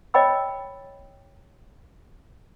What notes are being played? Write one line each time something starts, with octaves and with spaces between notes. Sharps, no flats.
C#5 D#5 G5 B5 E6